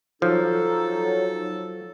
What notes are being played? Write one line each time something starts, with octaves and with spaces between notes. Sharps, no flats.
F3 F#3 D#4 A4